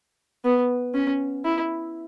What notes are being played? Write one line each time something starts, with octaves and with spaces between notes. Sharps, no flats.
B3
C#4
E4